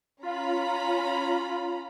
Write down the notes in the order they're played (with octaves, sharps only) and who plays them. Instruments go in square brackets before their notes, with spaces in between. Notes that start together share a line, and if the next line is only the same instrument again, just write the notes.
[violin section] C#4 A#5 B5 [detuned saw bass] F4